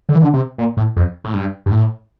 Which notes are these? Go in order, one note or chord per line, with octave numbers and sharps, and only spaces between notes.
D3
E3
D3
C3
A#2
A2
F2
A2
G2
G2
A2